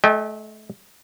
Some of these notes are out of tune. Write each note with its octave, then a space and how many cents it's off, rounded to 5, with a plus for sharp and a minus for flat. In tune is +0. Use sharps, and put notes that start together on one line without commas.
A3 -30 D#5 +0 G5 +25